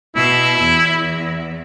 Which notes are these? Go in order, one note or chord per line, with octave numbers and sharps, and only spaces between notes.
B2 E4 E6
E2